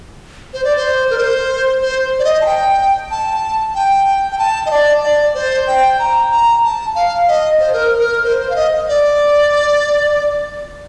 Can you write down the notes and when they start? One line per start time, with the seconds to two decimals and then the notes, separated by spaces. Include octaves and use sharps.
0.53 C5
0.64 D5
0.76 C5
1.10 A#4
1.18 C5
1.82 C5
2.19 D5
2.24 D#5
2.41 A5
2.46 G5
3.11 A5
3.75 G5
4.32 G5
4.38 A5
4.66 D#5
4.71 D5
5.03 D5
5.35 C5
5.68 G5
5.99 A#5
6.31 A#5
6.64 A5
6.95 F5
7.28 D#5
7.60 C5
7.73 A#4
7.99 A#4
8.24 C5
8.40 C5
8.50 F5
8.56 D#5
8.88 D5